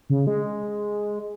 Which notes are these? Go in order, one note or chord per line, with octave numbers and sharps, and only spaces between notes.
C#3
G#3